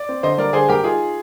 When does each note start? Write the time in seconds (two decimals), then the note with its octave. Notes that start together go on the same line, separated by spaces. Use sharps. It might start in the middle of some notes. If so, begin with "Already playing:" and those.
Already playing: D5
0.09 C4
0.23 D3 C5 D#5
0.38 G3 A#4 D5
0.53 D3 G#4 C5
0.68 G3 G4 A#4
0.84 D#4 F4 G#4